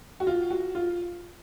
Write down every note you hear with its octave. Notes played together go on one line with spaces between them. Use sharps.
F#4
F4
F#4
F4